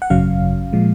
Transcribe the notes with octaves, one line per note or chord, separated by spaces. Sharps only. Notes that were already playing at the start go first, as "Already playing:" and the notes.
F#5
G#1 F#2 C#3 F#3 C#4 F5
A#2 F3 G#3